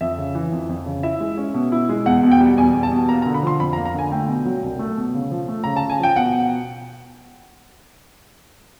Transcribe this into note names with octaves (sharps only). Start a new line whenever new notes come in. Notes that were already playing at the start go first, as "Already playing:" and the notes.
F2 E5
C#3
E3
F2
F2
C#3
E4 E5
G#3
C#4
B2
E4
G#3
E2 F#5
B2
G5
G3
E2 G#5
E2
A5
B2
A#3 A#5
A#5
D3
B5
F3 C6
F2 B5
A#5
A#3
A#5
D3 G#5
A3 G5
B2
F#3
C2
A3
B2
C#3
F3
A3
C#3 A#5
A5
C#3
G#5
F3 G5
B2 F#5